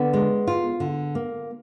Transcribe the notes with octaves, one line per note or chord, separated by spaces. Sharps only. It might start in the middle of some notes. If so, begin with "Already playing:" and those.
Already playing: D3 B3
G#3
F4
D3
A#3